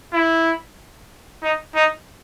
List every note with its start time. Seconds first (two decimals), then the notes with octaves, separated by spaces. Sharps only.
0.13 E4
1.42 D#4
1.75 D#4